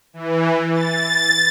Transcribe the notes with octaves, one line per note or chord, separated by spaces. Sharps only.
E3
A6